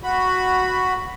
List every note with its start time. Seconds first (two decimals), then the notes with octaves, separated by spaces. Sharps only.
0.03 F#4 B5